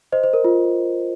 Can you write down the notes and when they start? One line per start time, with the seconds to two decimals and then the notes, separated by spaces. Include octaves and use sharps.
0.12 C5 D#5
0.24 C5
0.33 A#4
0.44 F4